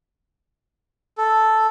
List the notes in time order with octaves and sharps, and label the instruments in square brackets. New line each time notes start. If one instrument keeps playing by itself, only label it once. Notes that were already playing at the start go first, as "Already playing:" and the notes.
[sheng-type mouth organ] A4